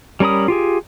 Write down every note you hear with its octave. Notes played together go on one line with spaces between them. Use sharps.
G3 C#4 A#4 B5 D#6
F4 G4 G#4